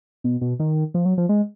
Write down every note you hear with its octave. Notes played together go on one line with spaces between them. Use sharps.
B2
B2
D#3
F3
F#3
F3
G#3